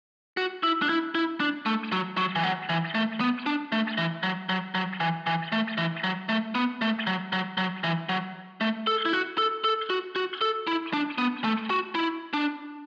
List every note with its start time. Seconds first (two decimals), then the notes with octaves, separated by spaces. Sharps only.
0.37 F#4
0.63 E4
0.82 D4
0.89 E4
1.15 E4
1.40 D4
1.66 A3
1.92 F#3
2.17 F#3
2.36 E3
2.43 F#3
2.69 E3
2.95 A3
3.20 B3
3.46 D4
3.72 A3
3.98 E3
4.23 F#3
4.49 F#3
4.75 F#3
5.00 E3
5.27 E3
5.52 A3
5.78 E3
6.04 F#3
6.29 A3
6.55 B3
6.81 A3
7.07 F#3
7.33 F#3
7.58 F#3
7.84 E3
8.09 F#3
8.61 A3
8.87 A4
9.05 E4
9.13 F#4
9.38 A4
9.64 A4
9.90 F#4
10.16 F#4
10.41 A4
10.67 E4
10.93 D4
11.18 B3
11.44 A3
11.70 F#4
11.95 E4
12.33 D4